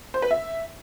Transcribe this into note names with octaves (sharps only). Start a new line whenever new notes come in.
C5
B4
E5